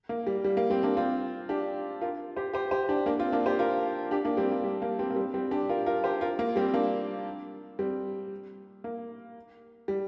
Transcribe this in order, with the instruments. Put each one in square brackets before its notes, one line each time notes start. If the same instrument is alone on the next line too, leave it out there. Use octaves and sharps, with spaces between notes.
[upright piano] A#3
G3
G3
A#3
G3 C4
A#3 D4
C4 F4
D4 G4
F4 A#4
G4 C5
G4 C5
G4 C5
D4 G4
A#3 D4
C4 F4
A#3 D4
G4 C5
F4 A#4
D4 G4
A#3 D4
G3 C4
A#3
G3
A#3
G3 C4
A#3
G3 C4
G3 C4
D4 G4
F4 A#4
F4 A#4
G4 C5
F4 A#4
A#3
G3 C4
A#3 D4
G3 C4
A#3
G3